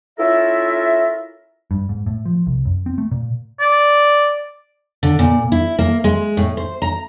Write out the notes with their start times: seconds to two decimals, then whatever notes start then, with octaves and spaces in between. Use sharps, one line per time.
0.19 C#4 E4 F4 A4 A#4 E5
1.71 G2
1.89 G#2
2.06 A2
2.26 F3
2.47 C2
2.65 F#2
2.86 C4
2.98 A3
3.11 A#2
3.60 D5
5.03 D3
5.19 A#2
5.52 E4
5.79 A#3
6.04 G#3
6.37 A2
6.57 C5
6.82 A#5